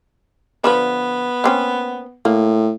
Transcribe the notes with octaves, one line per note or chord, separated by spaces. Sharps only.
D3 F3 B3 B4
A#3 C4 C#4
A2 A#3